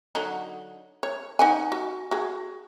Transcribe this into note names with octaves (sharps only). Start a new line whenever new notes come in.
D3 F#3 D#4
C#5
D#4 F#5 G#5
F#4
F#4 G#4